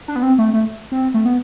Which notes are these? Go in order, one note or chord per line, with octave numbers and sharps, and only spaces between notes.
D4
B3
C4
A3
A3
C4
A3
B3